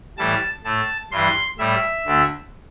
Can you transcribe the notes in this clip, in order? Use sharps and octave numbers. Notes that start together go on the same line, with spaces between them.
A2 E3 G3 A5
A2 A3 A5
G2 E3 G3 C6
A2 G3 E5
D2 D3 A3